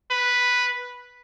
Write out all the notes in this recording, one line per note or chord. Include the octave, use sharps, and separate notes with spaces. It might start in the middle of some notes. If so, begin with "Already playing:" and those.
B4